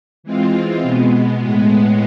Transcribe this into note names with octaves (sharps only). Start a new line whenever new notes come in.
E3 G#3 C4 F4
B2 G#3 B3
A2 G#3 B3